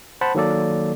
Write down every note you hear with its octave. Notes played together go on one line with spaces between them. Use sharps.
C5 F#5 A5 B5
D#3 F#3 A#3 A4 D5